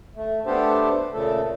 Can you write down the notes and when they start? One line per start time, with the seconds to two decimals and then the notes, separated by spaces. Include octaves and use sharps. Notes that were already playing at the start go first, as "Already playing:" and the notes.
0.16 A3
0.46 A3 B3 D4 G4 A4 C5
1.13 A#2 C#3 A3 A4